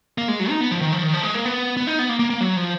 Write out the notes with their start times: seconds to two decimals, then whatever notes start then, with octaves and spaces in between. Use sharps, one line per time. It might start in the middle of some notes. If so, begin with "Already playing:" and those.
0.18 A#3
0.28 G#3
0.40 F#3
0.50 D#4
0.61 B3
0.71 F3
0.81 D#3
0.93 F3
1.03 D#3
1.14 F3
1.23 G#3
1.34 A#3
1.45 B3
1.77 B3
1.87 D#4
1.99 B3
2.09 A#3
2.19 A#3
2.30 A#3
2.40 F#3
2.56 F3